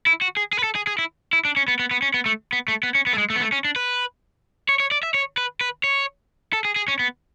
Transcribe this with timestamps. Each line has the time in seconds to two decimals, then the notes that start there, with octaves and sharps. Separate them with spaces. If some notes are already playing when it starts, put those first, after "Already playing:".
0.06 E4
0.21 F#4
0.37 G#4
0.53 G#4
0.59 B4
0.64 A4
0.75 G#4
0.87 G#4
0.99 E4
1.33 E4
1.45 D4
1.57 C#4
1.68 B3
1.79 B3
1.91 B3
2.02 C#4
2.14 B3
2.26 A3
2.53 B3
2.68 A3
2.83 B3
2.95 C#4
3.07 B3
3.13 A3
3.18 G#3
3.30 A3
3.36 B3
3.41 A3
3.52 C#4
3.64 D4
3.76 B4
4.69 C#5
4.80 C#5
4.91 D5
5.03 E5
5.14 C#5
5.37 B4
5.61 B4
5.84 C#5
6.53 A4
6.65 G#4
6.76 G#4
6.88 C#4
6.99 B3